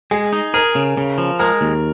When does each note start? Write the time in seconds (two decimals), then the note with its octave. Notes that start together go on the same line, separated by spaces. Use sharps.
0.11 G#3 G#4
0.33 D#4
0.54 G#4 A#4
0.75 C#3
0.97 C#3
1.18 F3
1.39 G#3 A#4
1.61 D#2